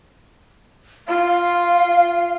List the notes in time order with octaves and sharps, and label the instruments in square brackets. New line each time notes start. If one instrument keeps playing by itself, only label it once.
[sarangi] F4 [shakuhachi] F5